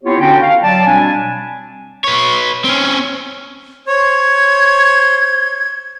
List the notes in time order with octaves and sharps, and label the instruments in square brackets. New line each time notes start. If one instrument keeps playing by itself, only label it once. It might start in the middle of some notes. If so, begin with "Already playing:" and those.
[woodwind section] B3 C4 E4 F4 G4 C#5
D3 C#4 D4 F#4 G5
F5
F#3 D5 A5
B2 G3 C4 D4 G#5
[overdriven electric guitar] B4 C#5
C4 C#4
[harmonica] C5 C#5 [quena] G#6